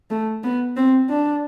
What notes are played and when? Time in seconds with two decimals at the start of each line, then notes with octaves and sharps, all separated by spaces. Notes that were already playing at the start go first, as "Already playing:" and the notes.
0.11 A3
0.44 B3
0.77 C4
1.10 D4